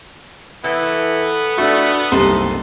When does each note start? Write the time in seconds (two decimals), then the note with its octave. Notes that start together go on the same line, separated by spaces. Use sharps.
0.64 E3 B3 A4
1.58 A3 D4 F#4
2.12 F#1 C2 D#4 A4 C5